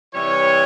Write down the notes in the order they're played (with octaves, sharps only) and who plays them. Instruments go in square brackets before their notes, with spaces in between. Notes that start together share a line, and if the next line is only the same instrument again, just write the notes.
[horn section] C3 E3 G3 C#5